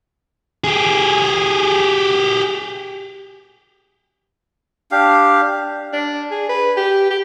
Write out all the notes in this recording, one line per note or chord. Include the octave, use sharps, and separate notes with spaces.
G4 G#4
D4 G4 F5
D4
G#4
B4
G4
G4